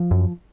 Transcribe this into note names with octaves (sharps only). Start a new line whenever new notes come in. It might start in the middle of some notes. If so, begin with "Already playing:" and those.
Already playing: F3
F#2